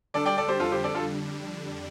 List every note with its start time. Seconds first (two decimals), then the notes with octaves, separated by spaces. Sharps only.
0.14 D3 G3 D4 A4 D5
0.26 D5 G5
0.38 A4 D5
0.48 G4 C5
0.60 F2 D3 G3 D4 F4 A4
0.72 G4 C5
0.84 A4 D5
0.95 F4 A4